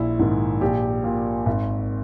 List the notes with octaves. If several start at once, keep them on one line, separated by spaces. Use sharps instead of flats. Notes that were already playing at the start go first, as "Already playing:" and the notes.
Already playing: A#1 E4
G#2 D#3
A#1 G4
A#2
G#1